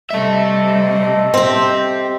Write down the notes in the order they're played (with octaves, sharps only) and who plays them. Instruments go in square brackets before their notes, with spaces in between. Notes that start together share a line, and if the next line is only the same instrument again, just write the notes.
[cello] C3 G3 [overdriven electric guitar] A4 E5 [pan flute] D#5
[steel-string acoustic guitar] C4 G4